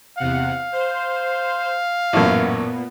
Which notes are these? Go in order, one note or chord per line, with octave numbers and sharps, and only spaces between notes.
E2 C3 F5 F#5
C5
A1 F#2 A#2 B3